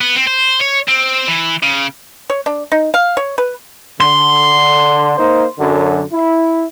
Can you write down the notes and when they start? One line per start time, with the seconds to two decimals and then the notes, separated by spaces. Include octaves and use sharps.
0.01 B3
0.15 C4
0.27 C5
0.61 C#5
0.89 C4
1.28 E3
1.63 C#3
2.30 C#5
2.46 D4
2.72 D#4
2.94 F5
3.17 C#5
3.38 B4
4.01 D3 C6
5.18 A#3 D#4 C5
5.59 F#2 D3
6.13 E4